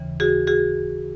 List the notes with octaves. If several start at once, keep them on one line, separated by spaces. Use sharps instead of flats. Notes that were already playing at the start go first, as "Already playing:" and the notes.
Already playing: D#2 C#3 E3
F#4 G#4
F#4 G#4